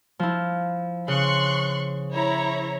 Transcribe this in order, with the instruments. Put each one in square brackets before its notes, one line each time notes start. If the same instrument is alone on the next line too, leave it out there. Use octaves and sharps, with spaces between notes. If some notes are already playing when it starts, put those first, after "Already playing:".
[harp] F3 E4
[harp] C#3 [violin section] C6 C#6 F#6
[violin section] E4 C#5 A#5